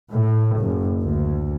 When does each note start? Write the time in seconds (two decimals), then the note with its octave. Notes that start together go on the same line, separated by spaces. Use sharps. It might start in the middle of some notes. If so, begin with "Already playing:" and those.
0.12 A2
0.60 F#1
1.02 D2